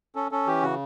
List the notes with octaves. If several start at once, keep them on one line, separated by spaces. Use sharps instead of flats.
C#4 A4
C#4 A4
E3 G4
C#3 F#4